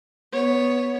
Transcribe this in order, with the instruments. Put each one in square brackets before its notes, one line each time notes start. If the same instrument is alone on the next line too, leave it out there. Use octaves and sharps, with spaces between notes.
[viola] B3 C#5